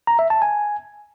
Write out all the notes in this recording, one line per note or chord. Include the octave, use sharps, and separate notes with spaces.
A#5
E5
A5
G#5